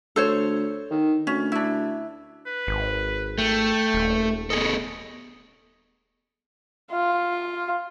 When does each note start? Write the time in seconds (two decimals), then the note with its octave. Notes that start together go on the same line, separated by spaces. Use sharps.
0.16 D2 A4 C5 C#5
0.91 D#3
1.27 D2 C#4
1.52 D4 E4
2.46 B4
2.67 G#1
3.38 A3 G5
3.94 D#1
4.50 B3 G#4 A4 D#5
6.91 F4